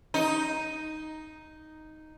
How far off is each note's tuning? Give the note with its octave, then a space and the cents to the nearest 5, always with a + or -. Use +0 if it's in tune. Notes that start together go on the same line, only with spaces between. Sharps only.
D#4 +0